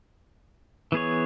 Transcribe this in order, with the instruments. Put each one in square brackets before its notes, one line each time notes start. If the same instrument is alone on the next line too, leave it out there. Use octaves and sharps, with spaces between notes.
[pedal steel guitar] E3 B3 G#4 C#5